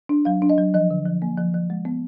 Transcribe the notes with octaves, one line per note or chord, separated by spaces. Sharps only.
D4
F#3 F5
D4
D#5
F#3
F3 D#5
D3
F3
A#3
F3
F3
G#3
B3